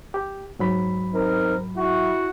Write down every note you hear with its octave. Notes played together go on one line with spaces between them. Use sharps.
G4
G#2 F#3 B5
C4 D#4 A#4
E4 F#4